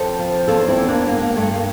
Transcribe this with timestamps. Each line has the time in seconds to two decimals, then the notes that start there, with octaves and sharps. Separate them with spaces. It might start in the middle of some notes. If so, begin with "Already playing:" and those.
Already playing: F2 A4 C5
0.19 F3
0.48 E2 F4 A4
0.68 C4 E4
0.78 E2
0.88 A#3 D4
1.07 G2 A#3
1.22 A#3
1.36 G2 A3
1.51 A#3